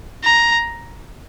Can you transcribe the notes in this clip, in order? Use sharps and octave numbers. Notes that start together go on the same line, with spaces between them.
A#5